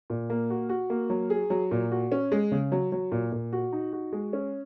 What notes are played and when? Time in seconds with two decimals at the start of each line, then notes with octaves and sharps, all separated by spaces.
0.10 A#2
0.30 A#3
0.50 F#4
0.69 F#4
0.90 A#3
1.10 F#3
1.30 G#4
1.50 F#3
1.71 A#2
1.91 F#4
2.12 C#4
2.32 G#3
2.52 C#3
2.72 F#3
2.92 F#3
3.12 A#2
3.32 A#2
3.53 F#4
3.73 D#4
3.93 F#4
4.12 G#3
4.33 C#4